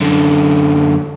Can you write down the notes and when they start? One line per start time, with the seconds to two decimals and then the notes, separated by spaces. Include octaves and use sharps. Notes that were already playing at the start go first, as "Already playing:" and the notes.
0.01 F#2 D3